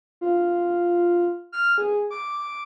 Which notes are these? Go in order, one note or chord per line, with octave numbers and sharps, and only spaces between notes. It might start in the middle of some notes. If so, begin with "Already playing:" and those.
F4
F6
G#4
D6